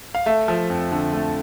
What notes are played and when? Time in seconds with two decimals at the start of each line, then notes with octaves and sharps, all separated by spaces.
0.15 F5
0.26 A3 E5
0.48 F3
0.70 F2
0.92 D3
1.13 A3